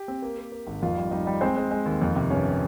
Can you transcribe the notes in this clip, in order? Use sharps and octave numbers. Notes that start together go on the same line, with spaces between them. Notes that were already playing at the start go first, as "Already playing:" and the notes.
Already playing: G4
C4
A#3
A#3
A#3
G#1
F2 F4 F5
G3
G3 D#4 D#5
G3
G#3 C4 C5
G#3
G#3
D#2
F2
C3
G1 C#4 C#5